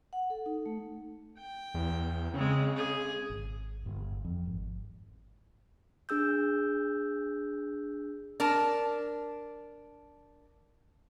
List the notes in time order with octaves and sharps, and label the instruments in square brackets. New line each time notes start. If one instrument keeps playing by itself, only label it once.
[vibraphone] F#5
A4
D#4
A3
[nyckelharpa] G5
[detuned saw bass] E2
[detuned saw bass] C#3 [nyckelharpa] G#3 C4
[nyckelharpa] G#4
[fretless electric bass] G#1
G1
F2
G#1
[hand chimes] D4 G#4 E6 G6
[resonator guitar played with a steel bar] D4 A#4 A5